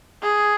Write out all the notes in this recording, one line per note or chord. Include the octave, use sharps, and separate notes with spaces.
G#4